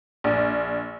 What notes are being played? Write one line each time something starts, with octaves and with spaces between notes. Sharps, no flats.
A#1